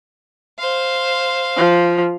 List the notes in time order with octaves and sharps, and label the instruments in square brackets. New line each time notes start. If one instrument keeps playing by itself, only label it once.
[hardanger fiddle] C5 F5
[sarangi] F3